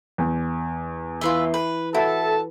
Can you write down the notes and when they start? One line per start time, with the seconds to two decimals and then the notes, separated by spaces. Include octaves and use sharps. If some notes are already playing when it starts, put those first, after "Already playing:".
0.18 E2
1.21 E3 F4 B4 E5 C6
1.54 B4
1.94 E4 F#4 A4 A5